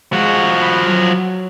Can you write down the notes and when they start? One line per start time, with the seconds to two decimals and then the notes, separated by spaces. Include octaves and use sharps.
0.13 F3 G#3 F#4
0.61 B5
0.88 F#3